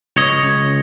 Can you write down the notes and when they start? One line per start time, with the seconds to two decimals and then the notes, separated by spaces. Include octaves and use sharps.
0.16 C#2 C#5 D#5
0.43 C#2